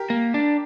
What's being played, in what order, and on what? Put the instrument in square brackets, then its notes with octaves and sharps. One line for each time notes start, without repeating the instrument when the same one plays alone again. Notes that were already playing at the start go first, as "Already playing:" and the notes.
Already playing: [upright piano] G4 A#4
[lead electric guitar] A#3
D4